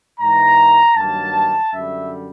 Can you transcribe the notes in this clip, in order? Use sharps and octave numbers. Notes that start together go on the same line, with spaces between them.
G#2 E3 G#3 A#5
G2 D#3 F#3 A#3 A5
F#2 D3 G3 E5